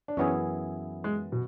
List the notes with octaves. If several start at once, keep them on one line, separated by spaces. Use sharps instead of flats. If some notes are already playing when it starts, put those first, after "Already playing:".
D4
F#2 E3 B3 C#4 E4 G#4
G#3
B2